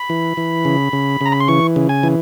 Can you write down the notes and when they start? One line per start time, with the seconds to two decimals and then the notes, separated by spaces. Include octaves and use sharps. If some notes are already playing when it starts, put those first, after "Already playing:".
Already playing: B5
0.09 E3
0.37 E3
0.65 C#3
0.93 C#3
1.21 C#3 A#5
1.32 B5
1.40 C6
1.48 E3 C#6
1.76 C#3
1.89 G#5
2.03 E3